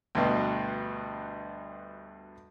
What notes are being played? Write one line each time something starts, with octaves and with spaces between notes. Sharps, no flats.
D2 G2 B2